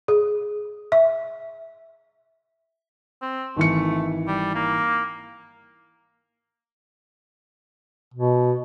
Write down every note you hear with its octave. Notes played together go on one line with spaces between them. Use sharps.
G#4
E5
C4
G#1 E3 A3 C#7
G3
A#3
B2